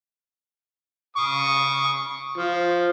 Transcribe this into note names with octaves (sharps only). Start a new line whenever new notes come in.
C#6 D#6
F3